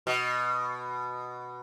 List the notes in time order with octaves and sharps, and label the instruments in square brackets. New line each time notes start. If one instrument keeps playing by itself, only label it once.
[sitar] B2